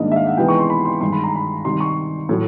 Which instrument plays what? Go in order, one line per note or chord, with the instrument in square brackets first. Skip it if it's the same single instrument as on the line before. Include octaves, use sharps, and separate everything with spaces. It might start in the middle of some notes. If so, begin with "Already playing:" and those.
Already playing: [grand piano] G#2 D#3 G3 A#3 D4 D#5
E5
F5
F#5
C3 E3 G#3 B3 D#4 G5
C#6
C6
B5
C6
G2 D#3 G#3 C6
B5
A#5
B5
C3 D#3 G3 C6
C#6
A2 F#3 A3